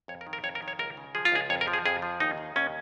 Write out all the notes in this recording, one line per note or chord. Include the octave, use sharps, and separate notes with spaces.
F2 C#5
A#4
D#3
A#4
F2 C#5
A#4
D#3
C#5
C#2 A#4
C#3
F3 G#4
F4
C#2 G#4
F2 C#5
A#4
F3
G#4
F2 G#4
F3
D#2 D#4
D#3
D#2 C#4